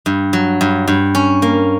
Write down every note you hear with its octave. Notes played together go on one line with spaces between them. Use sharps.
G2
F#3
G2
G2
C#4
A#3